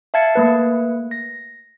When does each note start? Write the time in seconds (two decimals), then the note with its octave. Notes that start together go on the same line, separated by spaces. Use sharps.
0.14 E5 F5 A5 G#6 A6 C#7
0.35 A3 A#3 B4
1.11 A#6